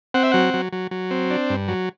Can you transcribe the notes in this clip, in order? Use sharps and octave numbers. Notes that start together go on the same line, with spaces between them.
C4 F#5
E5
F#3 F#5
F#3
F#3
F#3
C4
D4
G2
F#3